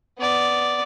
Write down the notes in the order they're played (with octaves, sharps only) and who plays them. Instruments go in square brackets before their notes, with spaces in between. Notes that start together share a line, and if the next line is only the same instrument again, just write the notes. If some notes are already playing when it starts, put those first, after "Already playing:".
[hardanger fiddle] B3 D5